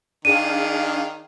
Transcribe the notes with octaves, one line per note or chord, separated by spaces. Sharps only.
D#3 D4 G#4 F5 D#7